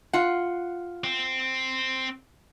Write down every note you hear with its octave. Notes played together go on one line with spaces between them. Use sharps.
F4 F#5
C4